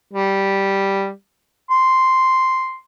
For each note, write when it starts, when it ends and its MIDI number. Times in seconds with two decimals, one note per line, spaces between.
0.13 1.10 55
1.71 2.79 84